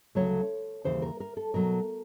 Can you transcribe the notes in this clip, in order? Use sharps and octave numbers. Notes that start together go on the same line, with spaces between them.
D2 C#3 F#3 A3 C#5
D#2 C#3 E3 C5
A#4
A#4
A4
B2 F#3 A3 A#4